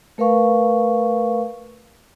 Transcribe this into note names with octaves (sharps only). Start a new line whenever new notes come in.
A3 A#4 B4 F5 C#6